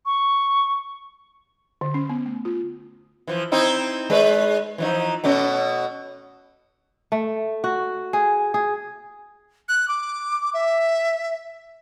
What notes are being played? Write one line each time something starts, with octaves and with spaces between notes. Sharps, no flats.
C#6
D3
C#4
B3
A3
F4
E3 F3
C4 D#4 E4
G#3 B4 D5
E3 F3 D#4
B2 A3 C#4
A3
F#4
G#4
G#4
F#6
D6
E5